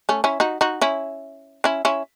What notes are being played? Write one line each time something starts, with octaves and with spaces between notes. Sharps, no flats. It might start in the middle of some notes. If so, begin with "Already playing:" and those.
A3 C#4
C#4 E4
D#4 F#4
D#4 F#4
C#4 E4
C#4 E4
C#4 E4